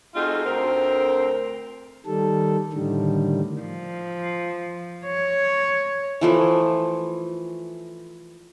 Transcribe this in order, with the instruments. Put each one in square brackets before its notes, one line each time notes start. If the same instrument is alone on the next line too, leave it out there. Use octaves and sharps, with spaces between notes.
[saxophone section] A3 C4 D#4 F4 F#4 G#4
D2 C4 A#4
[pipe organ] D#3 G3 A4
A2 D3 D#3 G3
[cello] F3
C#5
[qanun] E3 F3 A3